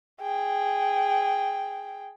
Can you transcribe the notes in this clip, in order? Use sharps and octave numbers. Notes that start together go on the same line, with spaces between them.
G#4 G5